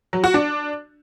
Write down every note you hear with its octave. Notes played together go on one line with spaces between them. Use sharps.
F#3
F#4
D4